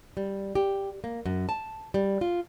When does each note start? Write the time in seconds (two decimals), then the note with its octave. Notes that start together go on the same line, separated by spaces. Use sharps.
0.17 G3
0.55 G4
1.04 A#3
1.25 F#2
1.49 A5
1.94 G3
2.21 F4